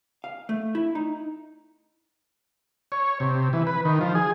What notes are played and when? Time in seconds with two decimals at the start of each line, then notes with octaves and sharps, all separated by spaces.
0.24 F5
0.49 A3
0.75 E4
0.95 D#4
2.92 C#5
3.20 C3
3.53 E3
3.67 B4
3.85 D#3
4.01 F3
4.15 G#4